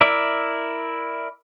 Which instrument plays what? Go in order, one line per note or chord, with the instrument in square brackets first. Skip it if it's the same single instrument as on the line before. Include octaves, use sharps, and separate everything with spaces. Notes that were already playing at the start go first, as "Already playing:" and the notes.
[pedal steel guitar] E4 A#4 D5 E5